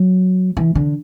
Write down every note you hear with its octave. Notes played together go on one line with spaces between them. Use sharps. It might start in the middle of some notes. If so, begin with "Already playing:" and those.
Already playing: F#3
E3
D3